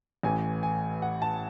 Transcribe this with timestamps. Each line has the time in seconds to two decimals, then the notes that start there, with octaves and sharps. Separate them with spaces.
0.23 A1 A2 E3 G#5
0.63 G#5
1.02 F#5
1.22 A5